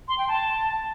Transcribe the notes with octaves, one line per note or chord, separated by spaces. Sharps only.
C6
G5
A5